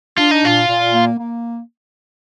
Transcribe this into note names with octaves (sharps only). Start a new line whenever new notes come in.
D4 F4
D#4
A#2 F4
A#2
A#3
A#3